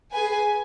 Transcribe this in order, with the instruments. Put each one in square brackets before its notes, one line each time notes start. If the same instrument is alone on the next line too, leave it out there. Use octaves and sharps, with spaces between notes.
[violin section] G#4 B4 G#5